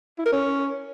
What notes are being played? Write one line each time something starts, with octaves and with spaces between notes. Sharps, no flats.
E4
A#4
C#4